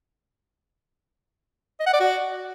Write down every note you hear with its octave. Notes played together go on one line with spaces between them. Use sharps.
D#5
F#5
D5
F#4